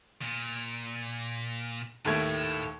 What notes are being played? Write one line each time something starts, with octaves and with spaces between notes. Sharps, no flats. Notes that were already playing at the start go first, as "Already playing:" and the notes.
A#2
D#2 A2 A3 G#6